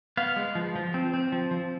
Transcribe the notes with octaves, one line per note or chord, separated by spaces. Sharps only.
B3 F5
G#3
F3
F3
C4
C4
F3
F3